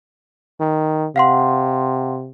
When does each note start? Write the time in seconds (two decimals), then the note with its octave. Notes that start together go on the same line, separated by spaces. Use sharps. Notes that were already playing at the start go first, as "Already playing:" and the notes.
0.60 D#3
1.16 C3 F5 F#5 C6